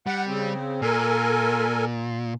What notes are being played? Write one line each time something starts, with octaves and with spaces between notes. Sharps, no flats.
G3 F#5
C#3 C4
A#2 A4 A#4 G#5